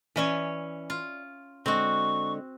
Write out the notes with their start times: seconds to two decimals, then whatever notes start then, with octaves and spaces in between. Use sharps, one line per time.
0.16 E3 C#4 C#5 D5 E5 G#5
0.90 F4
1.66 D3 G#3 C4 F#4 C#6